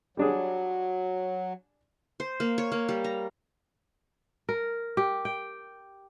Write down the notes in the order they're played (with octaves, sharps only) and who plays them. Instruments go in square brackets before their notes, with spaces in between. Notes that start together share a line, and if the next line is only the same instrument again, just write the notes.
[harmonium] F#3 [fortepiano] G3 D4 G#4
[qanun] C5
A#3
C#5
A#3
G3
A#5
[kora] A#4
G4
G5